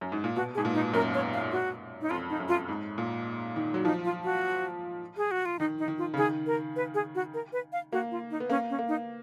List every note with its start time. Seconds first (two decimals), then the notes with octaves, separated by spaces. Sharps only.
0.01 F#2
0.12 G#2
0.24 A#2
0.36 B2 F#4
0.55 G#4
0.58 G#2
0.65 A#2
0.74 D#4
0.93 F#2 A#4
1.14 C#5
1.33 F5
1.52 F#4
2.01 D#4
2.10 F2 F4
2.30 D#4
2.40 F#2
2.48 F4
2.68 G#2
2.98 A#2
3.56 D#3
3.74 F#3
3.85 F3 D#4
4.04 F4
4.24 F#4
5.17 G#4
5.31 F#4
5.45 F4
5.59 D#3 D#4
5.78 D#4
5.88 D#3
5.98 F4
6.14 C#3
6.17 D#3 G#4
6.46 A#4
6.76 B4
6.94 G#4
7.15 F#4
7.34 A#4
7.53 B4
7.73 F5
7.92 A#3 F#4
8.11 F4
8.31 D#4
8.40 B3
8.50 A#3 C#4
8.70 C#4
8.79 A#3
8.88 D#4